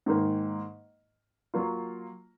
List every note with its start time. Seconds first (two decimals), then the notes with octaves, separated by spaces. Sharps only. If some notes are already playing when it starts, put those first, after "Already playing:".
0.06 G#2 D#3 A#3
1.54 F#3 A#3 F4